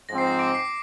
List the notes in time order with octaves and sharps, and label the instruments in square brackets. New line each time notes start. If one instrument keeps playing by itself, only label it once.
[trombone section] G#2 F3 C4 [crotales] A#6
[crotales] C7
A#6
D6 D7
C7